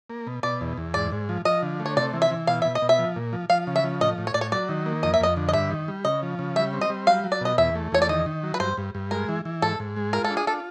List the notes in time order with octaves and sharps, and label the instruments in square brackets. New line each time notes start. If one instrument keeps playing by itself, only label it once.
[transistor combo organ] A#3
B2
[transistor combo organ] B2 [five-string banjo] D5
[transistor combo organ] E2
E2
[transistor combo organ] G#2 [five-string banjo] D5
[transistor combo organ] G#2
F3
[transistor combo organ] F3 [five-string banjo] D#5
[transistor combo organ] D3
A3
[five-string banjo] C#5
[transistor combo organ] C3 [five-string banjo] D5
[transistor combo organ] E3
[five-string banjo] E5
[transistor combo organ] E3
[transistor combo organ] B2 [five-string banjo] F5
[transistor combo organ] B2 [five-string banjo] E5
[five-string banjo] D#5
[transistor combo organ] B2
[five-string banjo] E5
[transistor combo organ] F3
A#2
F3
[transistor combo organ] F3 [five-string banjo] F5
[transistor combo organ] C#3
[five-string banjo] E5
[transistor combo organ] F3
[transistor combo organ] A2 [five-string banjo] D#5
[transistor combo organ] A2
[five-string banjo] C#5
[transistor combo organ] A2 [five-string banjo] D5
[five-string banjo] C#5
[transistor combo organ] F#3 [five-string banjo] D5
[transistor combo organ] D#3
A#3
[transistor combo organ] F2 [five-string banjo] D#5
[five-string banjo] E5
[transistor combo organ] F2 [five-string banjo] D#5
[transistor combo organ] D3
[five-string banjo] D#5
[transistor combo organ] G2 [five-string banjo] E5
[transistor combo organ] D#3
G3
[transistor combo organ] C#3 [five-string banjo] D#5
[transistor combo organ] F3
C#3
[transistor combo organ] G3 [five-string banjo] E5
[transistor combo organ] C4
[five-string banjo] D#5
[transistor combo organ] G3
[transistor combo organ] F#3 [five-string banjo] F5
[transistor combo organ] F#3
[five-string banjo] D5
[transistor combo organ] B2 [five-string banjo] D#5
[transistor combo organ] E2 [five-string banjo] E5
[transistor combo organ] A3
[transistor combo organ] E2 [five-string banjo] C#5
[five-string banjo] D5
[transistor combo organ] D#3 [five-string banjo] D#5
[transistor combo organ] D#3
F#3
[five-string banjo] B4
[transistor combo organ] G2 [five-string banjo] C5
[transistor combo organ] G2
G2
[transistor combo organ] G#3 [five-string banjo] A#4
[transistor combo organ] E3
E3
[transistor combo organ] G#2 [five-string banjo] A4
[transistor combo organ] G#2
G#3
[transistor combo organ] F4 [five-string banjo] A#4
[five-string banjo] A4
[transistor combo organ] D4
[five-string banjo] G#4
[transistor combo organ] F4 [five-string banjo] A4